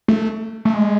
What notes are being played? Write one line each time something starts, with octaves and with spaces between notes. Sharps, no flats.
A3
A3
G#3